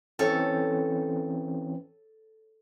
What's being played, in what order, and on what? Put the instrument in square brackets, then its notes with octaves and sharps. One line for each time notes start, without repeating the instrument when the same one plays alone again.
[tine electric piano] E3 C4 C#4 [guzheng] A4 C#5